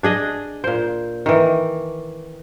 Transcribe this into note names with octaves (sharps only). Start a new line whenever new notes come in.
D4 G#4 D#5
A#2 C5
D#3 E3